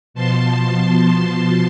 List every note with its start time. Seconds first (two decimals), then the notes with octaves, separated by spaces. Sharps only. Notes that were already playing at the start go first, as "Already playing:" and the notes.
0.14 B2 F3 A5 C6